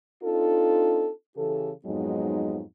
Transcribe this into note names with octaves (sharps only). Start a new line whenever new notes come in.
C4 D4 D#4 F4 A4
C#3 E3 G4 A4
F2 G#2 F#3 G#3 B3 D#4